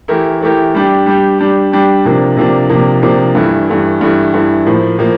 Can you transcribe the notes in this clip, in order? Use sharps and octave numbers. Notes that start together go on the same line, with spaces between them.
E3 A3 E4 G4 A#4
E3 A3 E4 G4 A#4
G3 D4 G4
G3 D4 G4
G3 D4 G4
G3 D4 G4
C3 F3 A#3 D4
C3 F3 A#3 D4
C3 F3 A#3 D4
C3 F3 A#3 D4
G2 E3 A3 E4
G2 E3 A3 E4
G2 E3 A3 E4
G2 E3 A3 E4
A2 F3 A#3
A2 F3 A#3